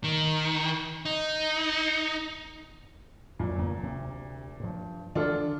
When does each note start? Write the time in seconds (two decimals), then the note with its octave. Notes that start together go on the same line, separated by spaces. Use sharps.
0.04 D#3
1.05 D#4
3.39 F2 A#2 F#3
3.58 C#3 A#3 B3
3.79 D2 C3
4.60 G2 F3
5.15 D3 E3 D4 F4 A4